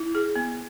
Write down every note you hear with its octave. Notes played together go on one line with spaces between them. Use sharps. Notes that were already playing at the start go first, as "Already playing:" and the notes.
Already playing: E4
G#4
B3